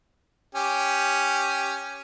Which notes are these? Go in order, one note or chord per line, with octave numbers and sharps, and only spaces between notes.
C#4 G4